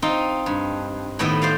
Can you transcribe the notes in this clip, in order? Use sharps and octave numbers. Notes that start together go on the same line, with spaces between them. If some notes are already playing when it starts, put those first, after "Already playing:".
C4 D#4 F4
G2
A2 D#3 B3 D#5 E5
C5 D5 F5